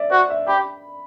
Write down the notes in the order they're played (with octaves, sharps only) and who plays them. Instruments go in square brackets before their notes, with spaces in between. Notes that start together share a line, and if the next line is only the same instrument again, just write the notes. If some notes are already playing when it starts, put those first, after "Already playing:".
Already playing: [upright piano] D5 E5
[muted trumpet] F#4 [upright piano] C5
[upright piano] E5
[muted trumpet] G4 [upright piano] B5